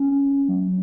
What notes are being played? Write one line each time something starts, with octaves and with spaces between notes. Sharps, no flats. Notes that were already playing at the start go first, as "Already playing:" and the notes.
Already playing: C#4
F#3